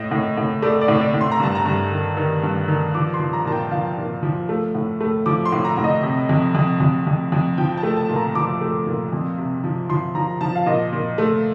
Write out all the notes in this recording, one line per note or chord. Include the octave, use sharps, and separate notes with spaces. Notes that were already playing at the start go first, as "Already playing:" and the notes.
Already playing: A2 D#5
A2
A2
A3 D5
D5
A2
D5
A2
C6
A#5
G2 A5
A#5
G2
D#3
D#3
G2
D#3
F3 D6
C6
F3
A#5
A#2 A5
G5
F3 F5
A#2
F3
A3
A2
A3
F3 D6
C6
A2
A#5
A2
D#5
C3
F2
F2
F2
F2
F2
F3 G5
A5
A3
A5
A#2
A#5
F3 D6
A3
A#2
F2
C3
F3
F3 C6
F3 A#5
F3 A5
F5
A#2 D#5
A#2
A3